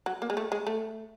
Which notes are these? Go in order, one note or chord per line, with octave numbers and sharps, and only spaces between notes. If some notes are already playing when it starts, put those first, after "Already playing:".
F#3
A#3
G#3
A3
G#3
A3